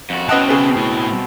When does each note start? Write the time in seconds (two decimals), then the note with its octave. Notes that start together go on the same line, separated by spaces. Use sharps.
0.10 F2 F#4
0.29 B2 C4 C#4 B4 D#5 F#5 A5
0.49 C#3 G#4 B4
0.77 A2 E4